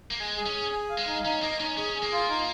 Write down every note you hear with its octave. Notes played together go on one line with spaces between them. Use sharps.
A#3
G#3 G#5
G#4
C#4
G#4
G#5
F5
G#3
D#4
C#4 D#4
A#3 D#5
C#4 D#4
C#4 G#4
G#4
A#3
F4
D#4